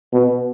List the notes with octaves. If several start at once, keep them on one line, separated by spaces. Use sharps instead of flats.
B2